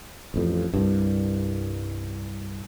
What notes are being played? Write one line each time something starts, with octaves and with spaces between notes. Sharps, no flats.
A1 F2
C2 G2